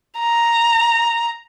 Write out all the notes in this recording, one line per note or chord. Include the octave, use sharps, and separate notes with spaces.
A#5